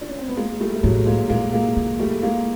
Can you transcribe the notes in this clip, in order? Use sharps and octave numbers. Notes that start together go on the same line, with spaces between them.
D4
C#4
C4
B3
G#3 A#3
G3 A3
A3
A2 F#3 G#3
G#3 A#3
A#2 G#3 A#3
G#3 A#3
C#3
G3 A3
G#3 A#3